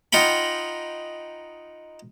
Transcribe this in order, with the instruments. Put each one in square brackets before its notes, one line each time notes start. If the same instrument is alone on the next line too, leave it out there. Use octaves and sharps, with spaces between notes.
[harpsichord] D#4 F4 F#5 G5 B5